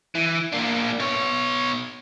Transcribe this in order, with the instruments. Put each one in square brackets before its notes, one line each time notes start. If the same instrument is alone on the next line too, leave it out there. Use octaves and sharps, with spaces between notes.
[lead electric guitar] E3
A#3 D4
B2 C#5